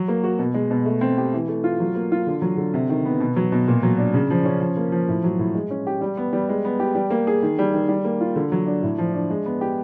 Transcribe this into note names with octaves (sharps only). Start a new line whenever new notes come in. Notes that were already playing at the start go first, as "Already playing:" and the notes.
Already playing: F#3
A#3
F#4
B2
G#3
B2
A3
C4
G4
E3
A3
F4
F#3
A#3
F4
D3
F#3
D3
C3
D#3
B3
B2
F#3
B2
A#2
F#3
D4
C#3
F3
C#4
F3
A#3
F3
A2
F#3
A2
G#3
C#4
G4
G3
B3
G3
G#3
B3
G4
G3
A#3
G#4
D#3
G3
D#3
G3
A#3
F4
D3
F#3
D4
A2
F3
D4
G#3
B3
G4